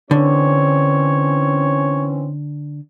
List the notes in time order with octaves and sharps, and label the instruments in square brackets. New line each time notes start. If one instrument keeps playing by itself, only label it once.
[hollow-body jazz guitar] D3 [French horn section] E3 C4 C#4 [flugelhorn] C#5